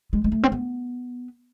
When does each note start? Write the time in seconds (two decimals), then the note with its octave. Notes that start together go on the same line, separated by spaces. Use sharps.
0.13 G#3
0.24 G#3
0.32 A3
0.43 C4
0.52 B3